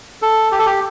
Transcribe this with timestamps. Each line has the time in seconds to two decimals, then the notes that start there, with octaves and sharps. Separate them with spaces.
0.22 A4
0.52 G4
0.59 A4
0.66 G4